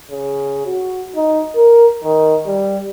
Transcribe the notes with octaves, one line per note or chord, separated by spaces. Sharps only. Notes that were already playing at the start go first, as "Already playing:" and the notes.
C#3
F#4
D#4
A#4
D#3
G3